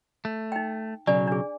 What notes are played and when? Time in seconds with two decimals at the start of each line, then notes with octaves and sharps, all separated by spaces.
0.25 A3
0.52 D#4 G5
1.07 B1 C#3 F#3 D5 G#5
1.28 D4 G#4